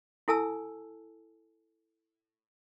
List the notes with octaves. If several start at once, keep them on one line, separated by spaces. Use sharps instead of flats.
E4 A4 G#5 A5 E6